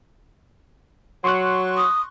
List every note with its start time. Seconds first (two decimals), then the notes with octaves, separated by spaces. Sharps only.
1.24 F#3 C6 C#6 F#6
1.77 D#6